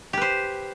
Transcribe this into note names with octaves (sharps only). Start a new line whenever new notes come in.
G4 B4 C5